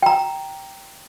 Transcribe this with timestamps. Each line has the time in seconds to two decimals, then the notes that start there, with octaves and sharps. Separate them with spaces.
0.03 G5 A#5